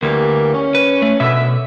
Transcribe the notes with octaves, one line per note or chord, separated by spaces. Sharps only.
D2 E3 G3 A#3
C#4
B4
A3
F#2 B2 D3 E5